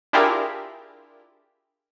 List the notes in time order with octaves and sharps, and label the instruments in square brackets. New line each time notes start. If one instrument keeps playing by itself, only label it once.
[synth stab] D4 E4 F4 G4 G#4 A#4